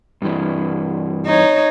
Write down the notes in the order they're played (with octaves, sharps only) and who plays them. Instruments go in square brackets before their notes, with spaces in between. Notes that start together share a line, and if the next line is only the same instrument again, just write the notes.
[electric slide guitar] G2 E3
[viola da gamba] D#4 C#5